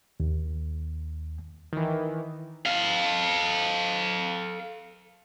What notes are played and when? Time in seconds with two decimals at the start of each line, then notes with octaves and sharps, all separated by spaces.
0.20 D#2
1.73 D#3 E3
2.66 A4 F5